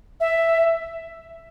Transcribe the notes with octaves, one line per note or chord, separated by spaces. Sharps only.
E5